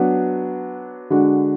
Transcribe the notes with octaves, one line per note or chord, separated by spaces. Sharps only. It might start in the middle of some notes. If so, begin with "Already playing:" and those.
Already playing: F#3 B3 D4
D3 G#3 D4 F#4